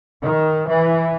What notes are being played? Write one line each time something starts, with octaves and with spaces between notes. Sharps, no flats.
D#3
E3